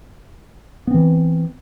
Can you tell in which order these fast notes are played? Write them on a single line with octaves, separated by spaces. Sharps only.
B3 C4 E3